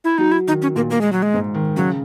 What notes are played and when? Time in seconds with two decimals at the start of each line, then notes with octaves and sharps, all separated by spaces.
0.04 E4
0.18 F#3 D#4
0.32 E4
0.47 D#3 D#4
0.62 C#4
0.76 A#2 A#3
0.90 A#3
1.01 G#3
1.12 F#3
1.22 G#3
1.34 G#2
1.54 D#3
1.76 C#3 F#3